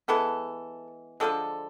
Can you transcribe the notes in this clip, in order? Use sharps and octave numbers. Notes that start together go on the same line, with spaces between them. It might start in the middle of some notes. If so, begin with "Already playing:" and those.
E3 G#3 B3 A4
D3 F3 G#3 A4